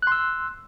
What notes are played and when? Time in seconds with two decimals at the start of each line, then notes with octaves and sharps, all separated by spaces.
0.02 F#6
0.07 C6
0.12 E6